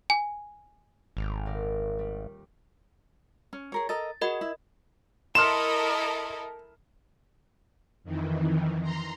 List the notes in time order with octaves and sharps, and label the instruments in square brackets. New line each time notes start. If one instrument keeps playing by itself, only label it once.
[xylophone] G#5
[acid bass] G#1 [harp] A3 D6 F6
[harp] D#1 A#4 D5
G3
[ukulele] C#4
G#4 A#4 C#5
[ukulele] A4 A#4 D#5 [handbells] A6
[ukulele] F#4 G#4 [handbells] A#4 D#5 B5
[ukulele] E4
[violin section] E4 A4 A#4 [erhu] D#5 [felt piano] C6 F6 [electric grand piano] E7
[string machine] F2 D#3 E3
A#5 C6